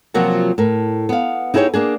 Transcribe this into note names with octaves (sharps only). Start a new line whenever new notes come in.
C3 F3 F#3 A#3 F4 F#4
A2 A#4
B3 F5
D#4 E4 G4 G#4 A#4 C#5
A#3 D4 G#4